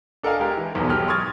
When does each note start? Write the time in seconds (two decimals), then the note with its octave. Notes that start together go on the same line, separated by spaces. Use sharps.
0.23 D4 A4 A#4 D#5 F5 G#5
0.40 G#3 G4 A#4
0.57 E3
0.75 B1 E2 G#2 B2 F#3
0.90 B1 G#3 G4 F6
1.08 C6 C#6 D#6 F6 G#6 A6